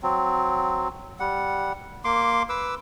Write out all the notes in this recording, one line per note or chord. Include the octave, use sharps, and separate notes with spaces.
F#3 C4
G3 F#5
A#3 C6 D6
B4 D6 E6